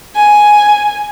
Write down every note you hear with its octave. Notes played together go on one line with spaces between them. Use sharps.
G#5